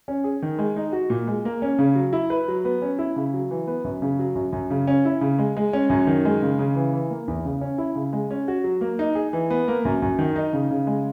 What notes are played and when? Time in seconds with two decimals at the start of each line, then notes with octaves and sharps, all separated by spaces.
0.08 C#4
0.24 G#4
0.42 D#3
0.59 G#3
0.76 D#4
0.93 F#4
1.10 A#2
1.27 G#3
1.45 A#3
1.62 C#4
1.79 C#3
1.95 F#3
2.13 E4
2.30 B4
2.48 F#3
2.65 B3
2.82 C#4
2.99 E4
3.16 C#3
3.34 F#3
3.51 E3
3.67 B3
3.84 F#2
4.02 C#3
4.19 F#3
4.35 F#2
4.53 F#2
4.70 C#3
4.87 C#4
5.05 E4
5.21 C#3
5.39 G#3
5.57 G#3
5.73 C#4
5.90 F#2
6.07 D#3
6.25 G#3
6.42 C#3
6.59 C#3
6.76 E3
6.93 E3
7.10 A#3
7.28 E2
7.45 C#3
7.61 C#4
7.78 E4
7.95 C#3
8.13 G#3
8.31 C#4
8.48 F#4
8.64 F#3
8.81 A#3
8.99 D#4
9.15 G#4
9.33 E3
9.50 B3
9.68 A#3
9.85 F#2
10.02 F#2
10.19 D#3
10.36 D#4
10.53 C#3
10.71 C#3
10.87 G#3